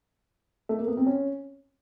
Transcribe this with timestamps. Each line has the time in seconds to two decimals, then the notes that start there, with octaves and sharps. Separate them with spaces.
0.69 A3
0.78 A#3
0.87 B3
0.97 C4
1.06 C#4